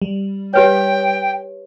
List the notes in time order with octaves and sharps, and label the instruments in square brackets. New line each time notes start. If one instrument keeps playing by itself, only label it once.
[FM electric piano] G3
[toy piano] G4 B4 C#5 [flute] G5